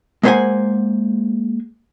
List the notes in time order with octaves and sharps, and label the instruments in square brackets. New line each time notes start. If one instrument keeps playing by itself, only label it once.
[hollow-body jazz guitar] G#3 A#3 B3 C5 F#5 G#5